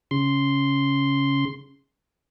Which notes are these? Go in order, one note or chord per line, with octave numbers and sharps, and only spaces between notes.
C#3 C6